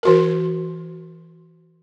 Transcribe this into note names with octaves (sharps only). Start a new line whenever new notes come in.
E3 F#4 A#4